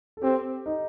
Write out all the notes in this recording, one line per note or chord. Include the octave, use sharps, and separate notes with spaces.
A4
C4 G4
D#4